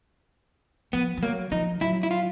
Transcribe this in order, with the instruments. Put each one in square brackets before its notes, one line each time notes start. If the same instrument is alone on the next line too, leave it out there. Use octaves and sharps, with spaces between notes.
[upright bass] F3 [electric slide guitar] B3
[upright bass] F3
[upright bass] F#3 [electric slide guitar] A#3
[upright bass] F3 [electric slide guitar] D#4
[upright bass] F#3 [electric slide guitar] E4
[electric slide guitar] E4
F4